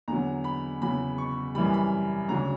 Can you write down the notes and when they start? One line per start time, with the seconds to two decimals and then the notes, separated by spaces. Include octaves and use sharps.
0.08 E2 D3 F#3 A#5
0.44 B5
0.82 E2 C#3 F#3 B5
1.18 C#6
1.55 F#2 E3 G3 B5
1.74 B5
2.29 D2 C#3 F#3 A#5